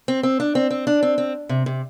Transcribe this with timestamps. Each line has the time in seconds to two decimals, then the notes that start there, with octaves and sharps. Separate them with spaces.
0.08 C4
0.23 C4
0.40 D4
0.55 C4
0.70 C4
0.87 D4
1.03 C4
1.18 C4
1.49 C3
1.66 C3